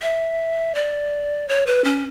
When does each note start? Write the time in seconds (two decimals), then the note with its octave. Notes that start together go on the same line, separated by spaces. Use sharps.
0.02 E5
0.75 D5
1.48 C#5
1.66 B4
1.84 C#4